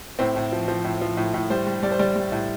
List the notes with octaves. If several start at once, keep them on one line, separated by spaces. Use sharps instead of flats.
A2 C4
A2
F3
F3
A2
F3
A2
A2
G3 C5
G3
G3 D5
C5
G3 D5
G3
A2